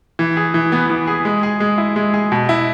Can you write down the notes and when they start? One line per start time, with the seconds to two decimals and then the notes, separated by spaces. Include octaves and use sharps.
0.19 E3
0.37 G#4
0.54 E3
0.72 B3
0.90 E3
1.07 G#4
1.25 G#3
1.43 G#4
1.60 G#3
1.78 E4
1.96 G#3
2.14 G#4
2.32 B2
2.49 E4